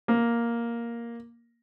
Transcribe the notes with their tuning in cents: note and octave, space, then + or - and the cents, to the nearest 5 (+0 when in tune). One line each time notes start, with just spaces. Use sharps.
A#3 +5